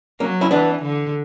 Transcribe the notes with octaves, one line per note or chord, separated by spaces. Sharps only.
F#3 A#3 C#4
C#4 E4
E3 B3 D4
D3